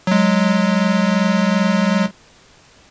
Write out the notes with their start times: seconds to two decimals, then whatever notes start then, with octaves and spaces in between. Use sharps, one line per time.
0.07 F#3 G#3